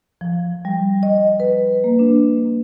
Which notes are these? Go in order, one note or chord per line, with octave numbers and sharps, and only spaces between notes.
F3
G3
D#5
B4
A#3
D4